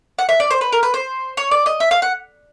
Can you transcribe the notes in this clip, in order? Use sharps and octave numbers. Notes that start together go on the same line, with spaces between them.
F#5
E5
D5
C5
B4
A#4
B4
C5
C#5
D5
D#5
E5
F5
F#5